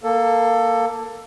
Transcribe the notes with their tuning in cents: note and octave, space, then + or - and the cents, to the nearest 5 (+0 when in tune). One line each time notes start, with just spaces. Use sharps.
A#3 +0 A4 +15